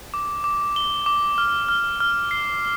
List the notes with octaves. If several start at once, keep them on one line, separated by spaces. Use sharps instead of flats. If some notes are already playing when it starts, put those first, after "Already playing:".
D6
D6
G7
D6
F6
F6
F6
C7